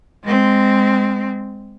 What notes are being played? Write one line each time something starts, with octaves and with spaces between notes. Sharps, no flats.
G#3 C4